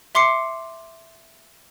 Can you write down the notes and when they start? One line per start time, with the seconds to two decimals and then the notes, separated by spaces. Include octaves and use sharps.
0.15 E5 C6 D6 C7 C#7